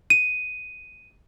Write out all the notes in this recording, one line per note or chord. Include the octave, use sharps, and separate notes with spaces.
D#7